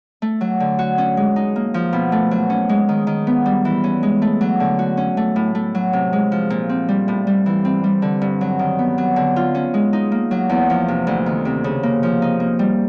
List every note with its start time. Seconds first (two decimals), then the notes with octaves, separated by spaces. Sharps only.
0.22 A3
0.41 F#3
0.60 D3
0.79 F#4
0.98 C#4
1.17 G#3
1.36 D#4
1.56 A#3
1.74 F3
1.93 B2
2.12 A3
2.31 F#3
2.50 C#4
2.69 G#3
2.89 D#3
3.07 D#3
3.27 B3
3.46 G3
3.65 E3
3.84 C#4
4.03 G#3
4.22 A3
4.41 F#3
4.60 D3
4.79 F#4
4.97 C#4
5.17 A3
5.36 A2
5.55 A3
5.75 F#3
5.93 C3
6.13 G#3
6.32 F3
6.50 A#2
6.69 C4
6.88 G3
7.08 A2
7.27 G3
7.46 E3
7.65 C4
7.84 G3
8.02 D3
8.21 G2
8.41 F#3
8.59 D#3
8.79 B3
8.98 F#3
9.16 D3
9.36 F4
9.55 C#4
9.74 G#3
9.93 D#4
10.12 A#3
10.31 F#3
10.49 E2
10.70 F3
10.88 C3
11.07 D2
11.26 D#3
11.45 C3
11.64 C#3
11.83 A#3
12.03 F3
12.22 D#4
12.40 A#3
12.59 G3